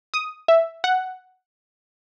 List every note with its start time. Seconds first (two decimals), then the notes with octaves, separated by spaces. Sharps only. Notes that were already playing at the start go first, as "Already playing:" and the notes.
0.14 D#6
0.48 E5
0.84 F#5